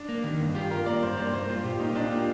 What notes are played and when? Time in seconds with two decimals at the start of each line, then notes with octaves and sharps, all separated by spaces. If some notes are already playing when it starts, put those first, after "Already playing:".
Already playing: D4
0.09 A#3
0.24 D#3
0.40 G2
0.55 F4 G4
0.71 F4 A#4
0.86 A#3 D5
1.02 G2 C5
1.17 A#3 D5
1.33 G2 C5
1.49 F4
1.64 A#2 G4
1.80 A#3 D#4
1.95 D4 F4
2.12 A#3 G4